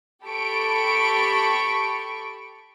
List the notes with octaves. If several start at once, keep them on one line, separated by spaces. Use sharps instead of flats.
G4 A4 B5 C#6 D7